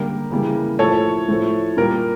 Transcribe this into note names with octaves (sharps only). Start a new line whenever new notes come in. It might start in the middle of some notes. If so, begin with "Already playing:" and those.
Already playing: D3 G3 A#3 A#4
C#3 E3 G3 A#3
A2 F3 A3 A4 C#5
A2 F3 A3
A#2 G3 A#3 A#4